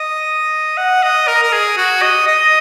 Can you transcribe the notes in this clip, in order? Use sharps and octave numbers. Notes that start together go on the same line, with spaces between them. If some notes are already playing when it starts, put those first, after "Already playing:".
Already playing: D#5
F#5
D#5
A#4
A#4
G#4
F#4
D#5
D#5